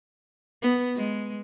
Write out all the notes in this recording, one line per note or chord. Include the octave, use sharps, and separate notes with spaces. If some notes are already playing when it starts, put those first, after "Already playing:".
B3
G#3